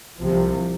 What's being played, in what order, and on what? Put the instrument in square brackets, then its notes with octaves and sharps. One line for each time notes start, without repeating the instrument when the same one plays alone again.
[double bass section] C2 C3 F3